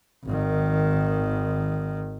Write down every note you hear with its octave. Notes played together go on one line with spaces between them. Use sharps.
G#1 D#3